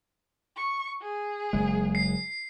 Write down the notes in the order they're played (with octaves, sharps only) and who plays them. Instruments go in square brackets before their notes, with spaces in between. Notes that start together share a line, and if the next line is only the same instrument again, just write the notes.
[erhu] C#6
G#4
[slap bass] F#1 G#3
[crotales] C7